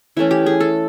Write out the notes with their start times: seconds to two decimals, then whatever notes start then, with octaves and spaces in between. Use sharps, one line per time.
0.17 E3 A3 C#4 E4
0.31 G4
0.46 G#4
0.60 A4